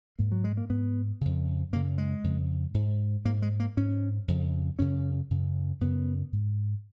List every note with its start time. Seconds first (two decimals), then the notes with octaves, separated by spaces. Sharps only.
0.19 G#2 A#3
0.32 F#3
0.44 G#3
0.57 A#3
0.70 G#2 B3
1.21 F2 C#3
1.72 F#2 C#3 A#3
1.98 G#3
2.24 F2 C#3
2.74 G#2
3.25 G#2 A#3
3.42 G#3
3.60 A#3
3.77 G#2 C#4
4.28 F2 C#3
4.79 F#2 C#3 C#4
5.30 F#2 C#3
5.81 F#2 C#3 B3
6.32 G#2